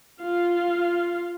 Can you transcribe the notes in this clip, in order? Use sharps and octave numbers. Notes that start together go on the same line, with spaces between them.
F4 F5